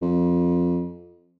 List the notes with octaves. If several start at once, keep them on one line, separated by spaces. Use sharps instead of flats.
F2